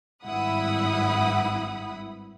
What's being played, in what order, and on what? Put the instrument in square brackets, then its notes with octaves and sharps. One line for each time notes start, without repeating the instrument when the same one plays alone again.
[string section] G#1 G2 E4 F#5 B5 D#6